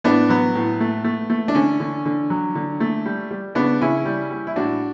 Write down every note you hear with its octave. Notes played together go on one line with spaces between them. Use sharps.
A2 B3 D4
F#3 B3
A2
A3
A3
A3
D4
D3 C#4
D3
D3
F#3
D3
A3
G3
G3
C#3 B3 D4
C#3 C#4 E4
G3
G3
E4
A2 D4 F#4